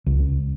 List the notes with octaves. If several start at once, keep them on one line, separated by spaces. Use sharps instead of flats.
C#2